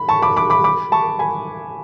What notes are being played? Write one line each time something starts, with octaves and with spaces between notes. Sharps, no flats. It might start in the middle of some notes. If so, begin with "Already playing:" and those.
Already playing: B5
A5 C#6
B5 D6
B5 D6
B5 D6
B5 D6
A5 C#6
G#5 B5